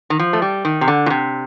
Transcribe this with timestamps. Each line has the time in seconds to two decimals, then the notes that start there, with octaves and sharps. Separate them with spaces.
0.10 D#3
0.19 F3
0.33 A3
0.42 G3
0.65 D#3
0.81 C3
0.88 D3
1.06 A#2
1.10 C3